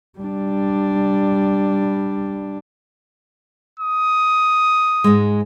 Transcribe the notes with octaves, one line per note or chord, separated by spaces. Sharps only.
G3 D4
D#6
G#2 G#3